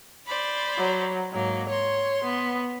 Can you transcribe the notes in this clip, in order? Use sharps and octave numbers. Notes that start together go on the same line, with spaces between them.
C5 D5 B5
F#3
G#2 F#3 A#3
C#5 C6
B3